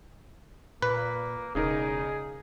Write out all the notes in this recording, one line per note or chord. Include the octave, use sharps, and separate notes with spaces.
A#2 A#3 B4
E1 C#3 D#4 G#4 A#4